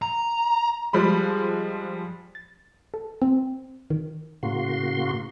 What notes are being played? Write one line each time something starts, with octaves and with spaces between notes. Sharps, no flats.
A#5
F3 G3 G#3 B5
A6
A4
C4
D#3
A2 C#3 A#3 F#4 C6